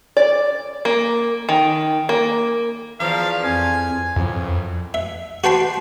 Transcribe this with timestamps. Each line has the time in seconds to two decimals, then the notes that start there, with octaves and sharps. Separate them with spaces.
0.17 D5
0.85 A#3
1.49 D#3
2.09 A#3
3.00 E2 F3 F5
3.44 F2 G#5
4.16 F2
4.94 E5
5.44 F#4 C5 G5 A5 B5 C6